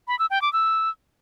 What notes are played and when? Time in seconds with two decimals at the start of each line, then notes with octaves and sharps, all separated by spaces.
0.08 B5
0.19 E6
0.30 G5
0.42 D6
0.53 E6